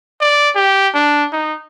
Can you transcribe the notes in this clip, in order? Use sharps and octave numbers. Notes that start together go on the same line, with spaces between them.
D5
G4
D4
D#4